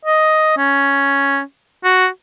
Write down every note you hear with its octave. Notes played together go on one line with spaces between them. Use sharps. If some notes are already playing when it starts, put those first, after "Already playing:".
D#5
C#4
F#4